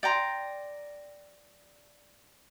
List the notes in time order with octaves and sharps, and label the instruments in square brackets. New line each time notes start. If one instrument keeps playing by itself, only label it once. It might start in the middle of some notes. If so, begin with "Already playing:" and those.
[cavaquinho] D5 G5 A#5 C6